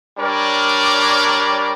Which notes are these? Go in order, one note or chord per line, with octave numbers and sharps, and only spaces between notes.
G3 D4 A#4 C#5 D5